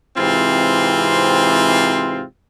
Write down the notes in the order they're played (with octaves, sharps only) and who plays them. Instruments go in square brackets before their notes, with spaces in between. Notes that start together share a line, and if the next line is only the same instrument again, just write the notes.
[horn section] G#2 C3 E3 C4 F4